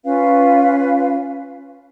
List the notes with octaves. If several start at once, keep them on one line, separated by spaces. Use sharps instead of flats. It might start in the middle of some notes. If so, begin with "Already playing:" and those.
C#4 F4 B4 F5